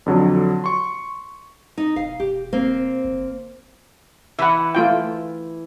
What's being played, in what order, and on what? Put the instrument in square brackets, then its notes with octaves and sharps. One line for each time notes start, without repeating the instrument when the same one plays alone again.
[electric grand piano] F2 D3 F#3
C6 C#6
[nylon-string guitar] D#4
[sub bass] E1 [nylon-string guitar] F5
[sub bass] E1 [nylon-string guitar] G4
[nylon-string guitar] A#3 C4 C5
[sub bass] G1
[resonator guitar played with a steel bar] E3 [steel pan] E5 F#5
[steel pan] A3 F4 G5